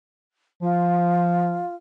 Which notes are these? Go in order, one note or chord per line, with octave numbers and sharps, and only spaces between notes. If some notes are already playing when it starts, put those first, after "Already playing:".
F3 F4